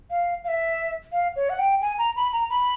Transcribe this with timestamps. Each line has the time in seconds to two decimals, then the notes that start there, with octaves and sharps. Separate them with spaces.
0.10 F5
0.44 F5
0.48 E5
1.12 F5
1.36 C#5
1.50 F#5
1.59 G5
1.82 G#5
1.98 A#5
2.16 B5
2.33 A#5
2.50 B5